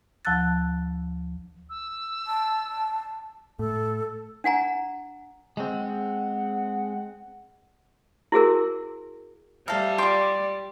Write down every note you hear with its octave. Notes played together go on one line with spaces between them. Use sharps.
D2 F3 A5 E6 F#6 A6
E6
A5
A2 A4
D4 F#5 G#5 A#5
G#3 C4 F#5
E4 F#4 G#4 A#4
C3 G3 A4 F5
F4 D5 G5 C6 D6